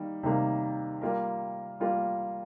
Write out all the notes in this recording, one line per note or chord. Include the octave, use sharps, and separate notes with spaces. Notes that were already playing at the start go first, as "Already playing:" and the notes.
Already playing: D#3 G3 A#3
C3 D#3 G3 A#3
G3 A#3 F4 A#4
G3 A#3 F4 A#4